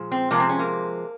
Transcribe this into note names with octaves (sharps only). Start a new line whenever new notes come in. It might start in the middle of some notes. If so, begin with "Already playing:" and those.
Already playing: A#2 F3 G#3
C4
C3 F3 G#3 A#3
C4
C#4
A#3